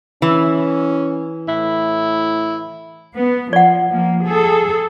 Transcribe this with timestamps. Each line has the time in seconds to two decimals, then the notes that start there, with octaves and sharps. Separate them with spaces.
0.22 E3 C#4
1.48 A2 E4
3.16 B3
3.53 F3 D5 F#5
3.91 F3 A#3
4.24 G#4 A4